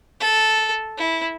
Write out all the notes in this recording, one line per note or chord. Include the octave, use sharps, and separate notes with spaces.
A4
E4